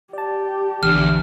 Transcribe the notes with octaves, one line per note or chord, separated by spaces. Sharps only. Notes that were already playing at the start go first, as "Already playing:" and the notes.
G4 D5 A5
A#1 E2 D3 F6